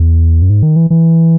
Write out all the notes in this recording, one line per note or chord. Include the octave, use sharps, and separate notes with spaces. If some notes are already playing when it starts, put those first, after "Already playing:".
Already playing: E2
F#2
G#2
D#3
E3
E3